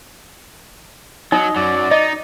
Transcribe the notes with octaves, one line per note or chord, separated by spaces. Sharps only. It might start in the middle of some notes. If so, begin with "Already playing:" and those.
F#3 D#4 D#5
F#2 F#3 D5
D#4 D#5